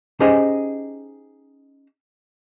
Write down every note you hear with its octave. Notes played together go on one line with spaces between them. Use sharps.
C#4 D#4 G4 G#4 C5 D#5